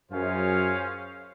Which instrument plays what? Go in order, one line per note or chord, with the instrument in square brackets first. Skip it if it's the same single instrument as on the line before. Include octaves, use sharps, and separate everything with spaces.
[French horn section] F#2 [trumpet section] C#4 F4 G#4 C5 F5